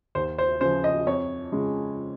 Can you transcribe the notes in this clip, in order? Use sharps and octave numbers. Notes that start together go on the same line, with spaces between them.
D#2 C5
C5
C#3 F3 C5
D#5
F2 C#5
C#3 G#3